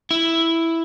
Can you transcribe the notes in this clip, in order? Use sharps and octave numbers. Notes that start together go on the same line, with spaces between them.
E4